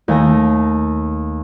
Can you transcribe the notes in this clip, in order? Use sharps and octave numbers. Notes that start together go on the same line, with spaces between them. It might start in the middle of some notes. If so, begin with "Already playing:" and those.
D#2 A3 G#5 A#6